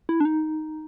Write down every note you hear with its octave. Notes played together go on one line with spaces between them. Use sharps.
E4
D4
D#4